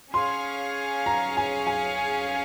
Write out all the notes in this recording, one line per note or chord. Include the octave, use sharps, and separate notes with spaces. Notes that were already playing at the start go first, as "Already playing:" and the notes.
C#4 G#4 C#5 F5 C6
A#5
G#5
G#5